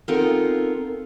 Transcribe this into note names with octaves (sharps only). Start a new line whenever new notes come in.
B3 C4 D#4 F4 A4 A#4